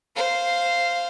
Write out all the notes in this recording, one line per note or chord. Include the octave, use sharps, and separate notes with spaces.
C5 F5